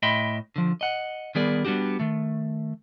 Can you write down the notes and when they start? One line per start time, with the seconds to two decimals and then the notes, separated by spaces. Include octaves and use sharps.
0.03 A2 D#5 E5 G5 B5 C6
0.56 D3 F3
0.81 D#5 F#5
1.35 D#3 G3 B3 G#4 A#4 D5
1.65 G3 B3 D4 F#4 G4
2.00 D#3 A3